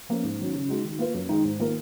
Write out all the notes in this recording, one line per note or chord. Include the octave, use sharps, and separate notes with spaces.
F3 A#3 C#4
G#2
D#3 F#3 C#4
C#3
G#3 D#4 F#4
D#3
A#3 F4 B4
F#2
D#3 G#3 D#4
G#2
D#3 A#3 F4 A#4